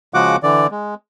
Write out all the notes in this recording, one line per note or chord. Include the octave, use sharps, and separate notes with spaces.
C#3 F3 G#3 F#4 F#5 D6
D3 E3 D5
G#3